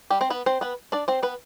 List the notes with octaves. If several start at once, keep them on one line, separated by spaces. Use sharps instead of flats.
G3 G4
C4 C5
B3 B4
C4 C5
B3 B4
D4 D5
C4 C5
B3 B4